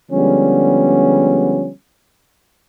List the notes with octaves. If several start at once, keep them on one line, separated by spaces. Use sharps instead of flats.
D3 F3 G3 G#3 B3 C#4